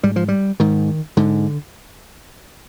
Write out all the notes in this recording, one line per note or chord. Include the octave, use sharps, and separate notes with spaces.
G#2 G3
F3
G3
G#2 D#3
G#2 D3